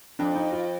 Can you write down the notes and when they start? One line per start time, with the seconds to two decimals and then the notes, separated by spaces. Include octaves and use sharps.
0.19 F2 D4
0.35 D#4
0.52 F4